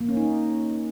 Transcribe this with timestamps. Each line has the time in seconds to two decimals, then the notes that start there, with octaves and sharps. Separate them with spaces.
0.01 A#3
0.09 C#4
0.17 D#4